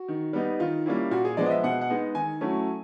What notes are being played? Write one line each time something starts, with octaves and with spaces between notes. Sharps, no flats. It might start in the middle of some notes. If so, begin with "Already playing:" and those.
Already playing: F#4
D#3
G3 B3 D#4
D#3 F4
G3 A#3 C#4 E4
A#2 F#4
G#4
F3 G#3 B3 D5
D#5
E5
B2 F#5
F#5
G#3 B3 D#4
D#3 G#5
F#3 A3 C#4 E4